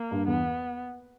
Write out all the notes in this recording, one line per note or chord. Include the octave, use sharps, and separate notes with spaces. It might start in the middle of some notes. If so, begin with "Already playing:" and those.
Already playing: A#3
G2
E2 B3